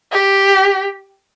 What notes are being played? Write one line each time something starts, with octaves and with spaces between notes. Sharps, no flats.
G4